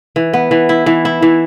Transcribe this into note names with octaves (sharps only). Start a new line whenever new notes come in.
E3
B3
E3
E4
E3
E4
E3